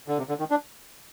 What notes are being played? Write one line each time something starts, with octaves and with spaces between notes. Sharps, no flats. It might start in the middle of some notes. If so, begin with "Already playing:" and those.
D3
C3
D3
D#3
D4